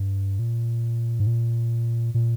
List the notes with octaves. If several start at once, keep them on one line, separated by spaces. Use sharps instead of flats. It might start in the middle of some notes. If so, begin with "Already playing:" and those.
Already playing: G2
A#2
G#2
A#2
A#2